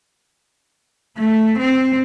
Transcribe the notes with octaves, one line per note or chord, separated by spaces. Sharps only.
A3
C4